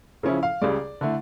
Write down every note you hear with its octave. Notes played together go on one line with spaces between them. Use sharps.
C#3 F3 C#4 E4
F5
C#2 C#3 G3 D5
D3 A3 E4